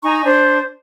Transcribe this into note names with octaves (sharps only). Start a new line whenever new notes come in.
D#4 G#5 A#5 C#6
D4 C5